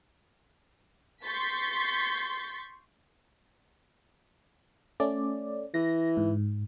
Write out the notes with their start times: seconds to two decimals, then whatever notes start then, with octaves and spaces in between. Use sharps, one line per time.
1.24 C6 C#6 G6 A6 B6
5.00 A3 C#4 D5
5.74 E3 A#6
6.17 G#2